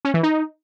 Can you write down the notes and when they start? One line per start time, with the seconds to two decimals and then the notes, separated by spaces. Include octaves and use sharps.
0.05 C#4
0.14 E3
0.23 D#4